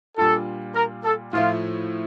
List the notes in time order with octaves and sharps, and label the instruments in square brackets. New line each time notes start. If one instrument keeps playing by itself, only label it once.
[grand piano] A#2 G3 D4 F4 [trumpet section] A4
[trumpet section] A#4
A4
[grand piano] A2 F3 A3 [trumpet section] F4